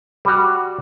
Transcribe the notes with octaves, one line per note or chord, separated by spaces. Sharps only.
G3 F#4